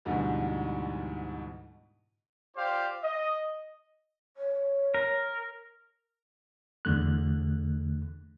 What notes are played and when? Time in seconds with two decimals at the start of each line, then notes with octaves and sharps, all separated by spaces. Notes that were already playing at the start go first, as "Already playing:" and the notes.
0.05 D2 G#2 B2 D3 E3 G3
2.57 F4 G4 C5 D5 F5
3.03 D#5
4.37 C#5
4.94 A#4
6.85 E2 D3 A3 F#6